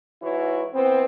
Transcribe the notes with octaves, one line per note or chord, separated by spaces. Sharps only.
G#2 E3 E4 F#4 C#5
E3 B3 C4